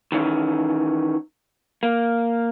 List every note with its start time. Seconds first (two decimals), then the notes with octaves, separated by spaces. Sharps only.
0.12 D#3 E3 C#4
1.83 A#3